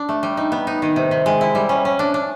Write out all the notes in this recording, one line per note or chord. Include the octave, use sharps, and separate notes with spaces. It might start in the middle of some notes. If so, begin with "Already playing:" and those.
Already playing: D4
A3
G3
D#4
B3
D#4
D#3
C3
C3
G#3
E4
G3
C#4
C#4
D4
D4